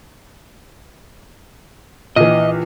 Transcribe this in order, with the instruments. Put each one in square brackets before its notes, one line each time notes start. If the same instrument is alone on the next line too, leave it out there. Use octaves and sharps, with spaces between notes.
[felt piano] A#1 E3 [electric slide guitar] D#5